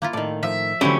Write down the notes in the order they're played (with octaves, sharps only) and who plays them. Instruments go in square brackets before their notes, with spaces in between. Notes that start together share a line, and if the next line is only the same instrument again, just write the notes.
[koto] A#3 E4 F4
[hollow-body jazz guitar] A2 D#3 [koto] D5
[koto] F3 [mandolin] E5
[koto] D3 E3 C4 [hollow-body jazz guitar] F#3 A3 G4 [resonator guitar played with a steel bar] C#4 [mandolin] E4